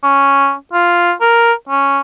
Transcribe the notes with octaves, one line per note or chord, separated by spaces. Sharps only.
C#4
F4
A#4
C#4